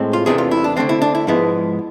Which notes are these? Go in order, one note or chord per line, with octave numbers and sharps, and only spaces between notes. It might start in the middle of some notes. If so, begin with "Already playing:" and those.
Already playing: A2 G#3 C4
F4
E2 C3 E3 A3 D4 G#4
F4
E4
D4
D3 A3 C4 D4
E4
D4
E4
G#2 F3 G#3 B3 E4